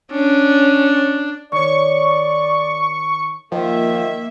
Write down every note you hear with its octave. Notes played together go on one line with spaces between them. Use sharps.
C#4 D4
D#3 C#5 D5 C#6
D#3 F3 A#3 E5